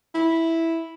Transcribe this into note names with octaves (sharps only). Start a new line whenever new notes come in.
E4